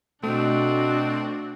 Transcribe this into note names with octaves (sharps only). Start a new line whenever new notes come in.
B2 A3 C4 D4 F#4